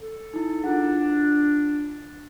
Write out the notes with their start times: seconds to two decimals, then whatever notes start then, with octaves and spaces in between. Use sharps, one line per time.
0.01 A4
0.33 D#4 E4
0.64 D4 F4 G#4 F#5